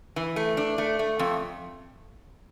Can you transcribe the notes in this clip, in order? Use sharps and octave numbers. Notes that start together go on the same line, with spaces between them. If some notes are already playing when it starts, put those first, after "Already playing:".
E3
A3
D4
A3
A3
F2